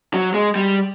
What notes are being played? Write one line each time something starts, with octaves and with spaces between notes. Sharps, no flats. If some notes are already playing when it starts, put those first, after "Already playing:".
F#3
G#3
G3